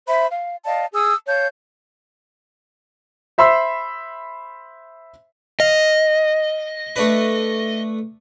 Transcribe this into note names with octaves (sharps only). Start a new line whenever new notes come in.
C5 E5 B5
F5
D5 D#5 F5 A5
G#4 D#6 E6
C#5 F5 A5 G6
C5 E5 B5 C6 E6
D#5 F5
A3 D4 B4